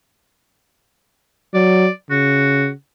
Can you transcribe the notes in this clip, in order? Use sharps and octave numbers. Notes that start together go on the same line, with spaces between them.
F#3 D5
C#3 F#4